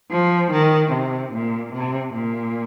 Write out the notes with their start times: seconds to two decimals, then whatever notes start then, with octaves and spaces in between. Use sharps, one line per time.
0.11 F3
0.52 D#3
0.92 C3
1.33 A#2
1.73 C3
2.14 A#2